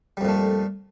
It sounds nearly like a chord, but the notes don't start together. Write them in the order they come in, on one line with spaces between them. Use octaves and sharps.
G3 F2 A#2 A3